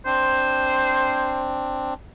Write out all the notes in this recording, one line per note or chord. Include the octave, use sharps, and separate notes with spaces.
C4 D4 C5